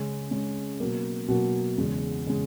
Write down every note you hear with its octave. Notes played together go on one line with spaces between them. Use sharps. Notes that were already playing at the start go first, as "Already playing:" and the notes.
Already playing: C#3 G#3 C#4
C#3 G#3 C#4
B2 F#3 A#3
B2 F#3 A#3
E2 C#3 G#3
C#3 G#3